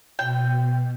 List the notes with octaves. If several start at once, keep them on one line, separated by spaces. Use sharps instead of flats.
B2 G5